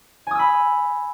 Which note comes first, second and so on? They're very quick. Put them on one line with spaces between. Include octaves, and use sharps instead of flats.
G#5 D#6 E6 B5